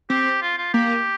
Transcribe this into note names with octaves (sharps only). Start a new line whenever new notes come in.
C4 G4
F4
F4
A#3 G4